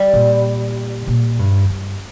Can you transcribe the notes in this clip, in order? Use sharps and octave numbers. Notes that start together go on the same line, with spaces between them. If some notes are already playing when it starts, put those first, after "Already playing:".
Already playing: G3
A#2
A#2
G2
G2